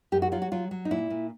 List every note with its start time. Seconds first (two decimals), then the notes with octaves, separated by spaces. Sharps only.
0.12 F#2 G4
0.22 F#4
0.32 F#3 F4
0.42 F#4
0.52 F#3 F4
0.71 F#3
0.85 D#4
0.91 A#2 E4
1.10 A#2